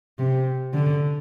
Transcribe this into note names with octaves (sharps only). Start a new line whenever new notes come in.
C3
D3